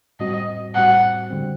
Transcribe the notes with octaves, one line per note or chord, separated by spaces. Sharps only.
A2 G3 C4 F#4 D#5
A2 G3 C4 F#4 F#5
D3 G3 C4